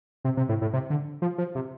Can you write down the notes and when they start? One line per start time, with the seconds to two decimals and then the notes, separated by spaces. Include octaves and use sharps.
0.25 C3
0.37 C3
0.49 A2
0.62 A2
0.73 C3
0.90 D3
1.22 F3
1.38 F3
1.55 C3